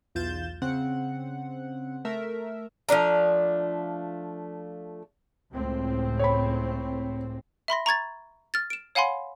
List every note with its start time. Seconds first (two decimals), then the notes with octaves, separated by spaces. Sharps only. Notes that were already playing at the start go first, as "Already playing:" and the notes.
0.15 B1 E2 F4 G6 A6 E7
0.62 C#3 C4 F#5
2.05 A3 A#4 E5
2.89 F3 A3 D4 A#5
5.51 C#2 A2 C4
6.19 C#5 B5
7.68 E5 B5 C6 A#6
7.86 A#5 C#6 G#6 A6
8.54 F6 A6
8.70 D7 E7
8.95 C#5 F5 F#5 G#5 B5 C6